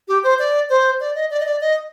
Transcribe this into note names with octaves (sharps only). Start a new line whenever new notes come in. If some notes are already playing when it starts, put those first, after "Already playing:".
G4
C5
D5
C5
D5
D#5
D5
D#5
D5
D#5